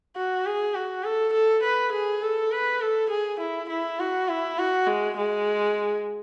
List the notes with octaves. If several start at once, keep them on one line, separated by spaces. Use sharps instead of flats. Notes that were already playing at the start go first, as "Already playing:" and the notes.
F#4
G#4
F#4
A4
A4
B4
G#4
A4
B4
A4
G#4
E4
E4
F#4
E4
F#4
G#3
G#3